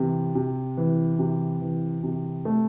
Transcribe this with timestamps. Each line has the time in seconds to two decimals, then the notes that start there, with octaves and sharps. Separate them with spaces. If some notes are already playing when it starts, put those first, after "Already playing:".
Already playing: C3 E3
0.35 C3
0.77 E3
1.19 C3
1.61 E3
2.03 C3
2.45 A3